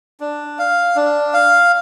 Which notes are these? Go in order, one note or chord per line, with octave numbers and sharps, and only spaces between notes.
D4
F5
D4
F5